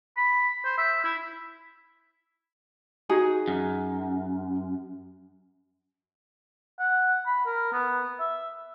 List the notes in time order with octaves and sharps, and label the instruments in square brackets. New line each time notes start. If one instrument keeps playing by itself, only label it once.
[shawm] B5
C5
E5
E4
[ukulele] D#4 F#4 G#4
[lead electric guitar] F#2
[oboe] F#5
B5
A#4
B3
E5